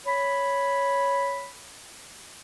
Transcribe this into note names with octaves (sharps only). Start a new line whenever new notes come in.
C#5 B5